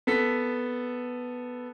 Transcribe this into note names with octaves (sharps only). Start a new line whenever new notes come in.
B3 A4 B6